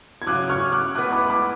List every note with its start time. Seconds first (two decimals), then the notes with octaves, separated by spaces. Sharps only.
0.22 G#6
0.27 C#3 F#3 C#4 D6 F#6
0.50 C#6 F6
0.72 D6 F#6
0.95 A2 G#3 B3 D6 F#6
1.12 B5 D6
1.30 B5 D6